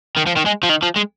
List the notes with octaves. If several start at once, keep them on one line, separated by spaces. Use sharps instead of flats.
D#3
F3
D#3
G#3
F3
D#3
F3
G#3